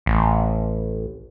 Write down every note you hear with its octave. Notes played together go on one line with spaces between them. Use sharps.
A1